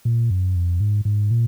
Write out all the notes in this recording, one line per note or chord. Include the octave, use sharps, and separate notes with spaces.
A#2
F#2
F2
G#2
G#2
A#2